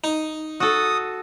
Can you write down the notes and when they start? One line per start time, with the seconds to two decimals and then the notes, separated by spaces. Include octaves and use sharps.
0.04 D#4
0.60 F#4 A4 D#6